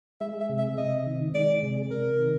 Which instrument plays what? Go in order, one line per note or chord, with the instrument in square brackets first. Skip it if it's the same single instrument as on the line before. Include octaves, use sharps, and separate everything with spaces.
[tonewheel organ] G#3 [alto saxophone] E5
[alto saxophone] E5
[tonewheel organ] C3
[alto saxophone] E5
[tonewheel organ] C3 [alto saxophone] D#5
[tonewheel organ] D#3
[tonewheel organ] G#3 [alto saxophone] D5
[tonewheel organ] C3
[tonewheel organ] C3 [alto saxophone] A#4
[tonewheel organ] D#3